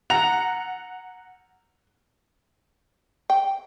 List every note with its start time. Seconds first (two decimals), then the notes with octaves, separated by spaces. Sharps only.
0.10 F#5 A#5 F7
3.30 G5